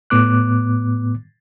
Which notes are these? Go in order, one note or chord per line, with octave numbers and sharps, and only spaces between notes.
A2 B3 D6 F#6